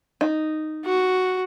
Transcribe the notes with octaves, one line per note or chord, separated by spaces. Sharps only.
D#4
F#4